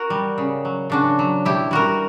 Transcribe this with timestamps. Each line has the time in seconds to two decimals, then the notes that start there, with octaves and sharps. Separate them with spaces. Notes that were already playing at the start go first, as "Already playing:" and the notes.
Already playing: F#4 A#4
0.10 G3
0.38 C#3
0.65 F#3
0.90 C#3 D4 F#4
1.19 F#3
1.45 B2 E4 G4
1.71 G3 F#4 A#4